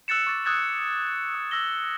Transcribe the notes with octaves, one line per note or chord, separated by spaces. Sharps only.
E6 F#6 A6 C#7 E7
C#6 D6 A6
D#6 E6 F#6 G#6 A6 E7
E6
E6 A6 A#6 G7